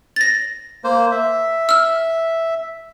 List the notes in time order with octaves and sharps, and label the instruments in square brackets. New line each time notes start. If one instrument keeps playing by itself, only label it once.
[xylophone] A6 A#6
[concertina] A#3 C5
E5
[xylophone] E6 F6